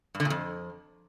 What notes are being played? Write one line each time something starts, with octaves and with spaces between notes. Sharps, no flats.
G2
D3
A#2
F2